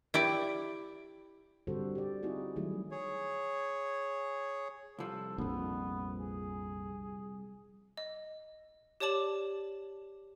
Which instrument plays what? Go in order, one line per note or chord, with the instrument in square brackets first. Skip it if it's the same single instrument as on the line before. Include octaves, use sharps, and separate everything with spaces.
[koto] E4 G4 D5
[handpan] D3 G3 C4 F#4 A4 C5
G4 D5
C4 D#4 E4 F#4 G#4
D#3 F#3 G3 A3 E4 G#4
[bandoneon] G#4 C#5
[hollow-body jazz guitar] C2 F3 [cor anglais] A4
[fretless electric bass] A#1 F2 [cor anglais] B3
[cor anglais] G#4
[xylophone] D#5
G4 C#5 D5 A5 D6 F#7